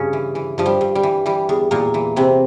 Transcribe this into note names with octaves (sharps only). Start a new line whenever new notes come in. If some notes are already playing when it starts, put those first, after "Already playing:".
Already playing: G2 C#3 C#4
E3
E3
G2 F3
G3
G2
G3
E3
E3 G3
E2
E2 A#2 A#3
E3
C3 E3 C4